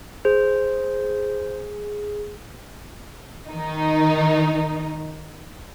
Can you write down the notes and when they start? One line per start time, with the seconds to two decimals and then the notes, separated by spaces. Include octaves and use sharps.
0.25 G#4 C5
3.49 D#3 D#4